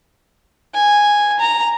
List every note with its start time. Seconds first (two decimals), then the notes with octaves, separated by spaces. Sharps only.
0.75 G#5
1.40 A#5